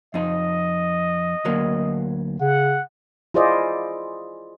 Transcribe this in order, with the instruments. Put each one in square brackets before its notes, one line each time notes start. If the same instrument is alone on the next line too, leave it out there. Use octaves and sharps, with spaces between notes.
[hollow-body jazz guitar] F2 D#4 [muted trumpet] D#5
[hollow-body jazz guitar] D2 F#3 A#3
[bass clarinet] C#3 [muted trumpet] F#5
[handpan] E4 F4 G#4 C5 D5 D#5